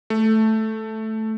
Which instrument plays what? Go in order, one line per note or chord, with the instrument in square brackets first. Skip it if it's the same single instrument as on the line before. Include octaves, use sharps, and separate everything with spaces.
[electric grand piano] A3